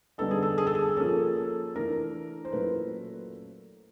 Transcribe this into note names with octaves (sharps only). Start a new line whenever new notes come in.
D3 G3 B3 D#4 A4
G#4
A4
G#4
A4
G#4
F3 A#3 C#4 A4
A4
E3 A3 D4 A#4
C5
A#2 F#3 A3 C#4 E4 B4